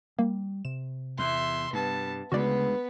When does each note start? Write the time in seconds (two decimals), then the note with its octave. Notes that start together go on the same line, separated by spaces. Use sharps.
0.19 G3 A#3
0.65 C3 E7
1.19 E2 E5 C6
1.73 G2 B3 A5
2.32 D2 C#3 G#3 B3 F#4 B4 D5